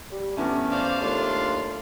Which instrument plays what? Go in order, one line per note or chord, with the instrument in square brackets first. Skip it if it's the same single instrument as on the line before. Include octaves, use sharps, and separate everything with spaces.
[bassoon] G3
[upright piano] E2 B3 C#4 [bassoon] A3
[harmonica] C5 D5 F5
[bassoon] D#2 [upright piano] A3 [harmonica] D4 F4 C6